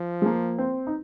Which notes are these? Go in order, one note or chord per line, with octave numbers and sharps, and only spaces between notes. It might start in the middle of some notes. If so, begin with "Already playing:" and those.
Already playing: F3
G#3
A#3
C4
D#4